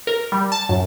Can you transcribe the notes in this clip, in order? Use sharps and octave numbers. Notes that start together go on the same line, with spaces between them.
A#4
G3
A5
F#2